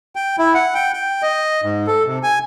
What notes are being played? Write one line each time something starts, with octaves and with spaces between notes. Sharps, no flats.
G5
E4
F#5
G5
G5
D#5
G#2
A4
C3
G#5